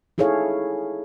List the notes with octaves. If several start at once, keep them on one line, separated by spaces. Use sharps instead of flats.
D#4 E4 G#4 A4 C#5 F5